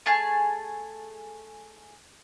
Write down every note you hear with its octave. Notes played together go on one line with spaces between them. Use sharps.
A3 G#4 A5